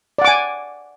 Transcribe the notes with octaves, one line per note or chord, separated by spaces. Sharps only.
D5 F#5 G#5 D6